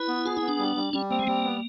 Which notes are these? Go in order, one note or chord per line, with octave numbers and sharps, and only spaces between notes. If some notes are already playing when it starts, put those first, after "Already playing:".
Already playing: E4 B4
B3
F4 G#4
B3 E4
D4
G3
G3
G3 C#4
A#3 C4
G#3
G3 A#3
B3